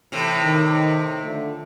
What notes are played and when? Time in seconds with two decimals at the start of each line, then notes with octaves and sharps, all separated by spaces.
0.12 A2 C3 E3
0.43 D#3
1.24 D3 F3 A3